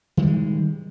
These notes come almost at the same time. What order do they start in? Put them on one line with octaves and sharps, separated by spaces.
D#3 G3 G#3